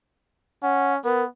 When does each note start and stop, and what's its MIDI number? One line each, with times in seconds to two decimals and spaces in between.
0.63 0.98 61
0.63 0.93 78
1.04 1.26 59
1.04 1.24 70